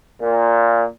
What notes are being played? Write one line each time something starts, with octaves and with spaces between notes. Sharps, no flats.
A#2